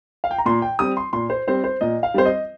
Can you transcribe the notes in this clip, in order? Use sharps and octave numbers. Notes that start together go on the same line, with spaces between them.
F5
G5
A#5
A#2 C6
G5
G3 C4 D#6
C6
A#2 C6
C5
G3 C4 C5
C5
A#2 D#5
F5
G3 C4 C5
D#5